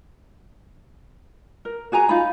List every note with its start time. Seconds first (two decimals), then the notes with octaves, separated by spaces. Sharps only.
1.65 A#4
1.92 F#4 G#4 G#5 A#5
2.09 D#4 F4 B5